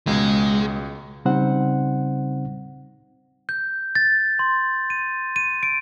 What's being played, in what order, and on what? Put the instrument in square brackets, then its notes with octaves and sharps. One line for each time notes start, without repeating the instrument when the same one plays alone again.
[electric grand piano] C#2 B2 [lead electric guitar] G#3
[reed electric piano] C#3 G3 C4 D#4 C5 F#5
[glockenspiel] G6
A6
C6
D#7
D#7
D7